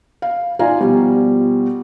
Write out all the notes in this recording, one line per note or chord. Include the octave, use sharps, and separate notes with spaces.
F5
D#4 F4 D5 F5 G#5 A#5
B2 F3 G3